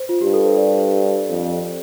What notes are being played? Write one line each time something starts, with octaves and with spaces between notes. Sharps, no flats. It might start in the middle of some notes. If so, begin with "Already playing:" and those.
Already playing: C5
F4
G2 G4
A4
C5
D5
F2